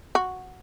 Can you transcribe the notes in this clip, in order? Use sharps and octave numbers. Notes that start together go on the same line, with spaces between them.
F#4